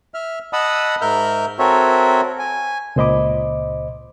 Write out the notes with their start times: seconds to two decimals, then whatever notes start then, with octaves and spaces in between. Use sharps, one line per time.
0.14 E5 F6
0.53 D#5 F#5 A5 B5 D#6 E6
1.01 G#2 A#4 E5 F6 G6
1.59 C4 F#4 A4 A#4 C#5 E5
2.39 G#5
2.96 C#2 A#2 C5 D#5 B5 D6